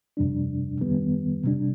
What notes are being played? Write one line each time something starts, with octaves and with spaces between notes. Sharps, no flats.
F2 C3 G3 D4
F2 D#3 G3 B3
C3 G3 D4